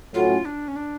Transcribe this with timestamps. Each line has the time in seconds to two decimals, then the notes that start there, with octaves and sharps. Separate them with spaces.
0.13 A2 F#3 C#4 F4
0.45 D4
0.68 C#4
0.76 D4